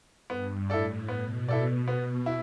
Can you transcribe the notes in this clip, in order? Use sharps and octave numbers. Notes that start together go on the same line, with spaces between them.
G2 B3
A2 E4 A4 D5
B2 B3
E4 A4 D5
B3
E4